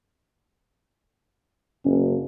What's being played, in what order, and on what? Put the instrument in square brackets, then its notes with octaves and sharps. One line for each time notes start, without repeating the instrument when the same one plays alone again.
[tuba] F#1 [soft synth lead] C#4